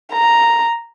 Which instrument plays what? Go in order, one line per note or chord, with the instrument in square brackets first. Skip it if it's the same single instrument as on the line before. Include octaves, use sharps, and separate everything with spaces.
[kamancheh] A#5